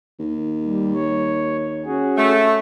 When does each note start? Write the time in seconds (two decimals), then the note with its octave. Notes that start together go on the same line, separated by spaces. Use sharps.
0.19 D#2
0.62 G3
0.95 C#5
1.85 C#4 F#4 G#4
2.17 A3